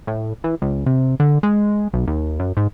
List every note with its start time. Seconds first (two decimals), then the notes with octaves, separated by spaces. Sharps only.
0.07 A2
0.44 E3
0.62 C#2
0.86 C3
1.20 D3
1.43 G#3
1.94 B1
2.07 D#2
2.40 F#2
2.57 G#2